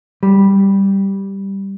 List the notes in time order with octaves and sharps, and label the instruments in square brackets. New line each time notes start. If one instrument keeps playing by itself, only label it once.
[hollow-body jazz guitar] G3